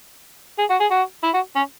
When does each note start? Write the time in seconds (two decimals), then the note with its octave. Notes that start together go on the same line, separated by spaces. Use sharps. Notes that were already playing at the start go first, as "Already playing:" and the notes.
0.59 G#4
0.70 F#4
0.80 G#4
0.91 F#4
1.24 E4
1.34 F#4
1.56 C#4